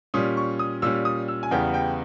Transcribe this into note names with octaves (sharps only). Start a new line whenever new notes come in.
A#2 G3 C#4 D#6
C#6
D#6
A#2 G3 C#4 E6
D#6
E6
G#5
E2 C#3 G3 B3 G5
G5